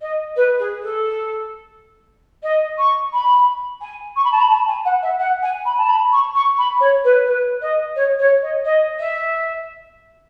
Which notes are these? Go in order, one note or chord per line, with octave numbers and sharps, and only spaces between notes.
D#5
B4
G#4
A4
D#5
C#6
B5
G#5
C#6
B5
A5
B5
A5
G#5
F#5
E5
F#5
G#5
B5
A5
B5
C#6
C#6
B5
C#5
B4
B4
D#5
C#5
C#5
D#5
D#5
E5